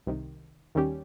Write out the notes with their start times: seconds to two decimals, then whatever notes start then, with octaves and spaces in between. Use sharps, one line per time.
0.07 C2 C3 D#3
0.75 D#2 D#3 G3 C#4 G4